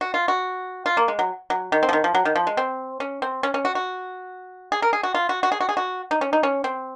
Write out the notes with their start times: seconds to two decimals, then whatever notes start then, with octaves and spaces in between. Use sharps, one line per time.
0.01 F#4
0.14 F4
0.28 F#4
0.86 F4
0.97 A#3
1.08 G#3
1.19 F#3
1.50 F#3
1.72 D#3
1.83 C4
1.89 F3
1.93 D#3
2.04 F3
2.15 F#3
2.25 D#3
2.36 F3
2.47 G#3
2.57 C4
3.00 C#4
3.22 C4
3.43 C#4
3.54 C#4
3.65 F#4
3.75 F#4
4.72 G#4
4.82 A#4
4.93 G#4
5.03 F#4
5.15 F4
5.29 F#4
5.43 F#4
5.52 G#4
5.61 F#4
5.69 G#4
5.77 F#4
6.11 D#4
6.21 C#4
6.33 D#4
6.43 C#4
6.64 C4